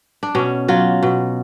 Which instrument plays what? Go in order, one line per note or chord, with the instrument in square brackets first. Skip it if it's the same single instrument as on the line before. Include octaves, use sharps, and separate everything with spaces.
[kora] D4
B2 C#4
F#3 F4
B2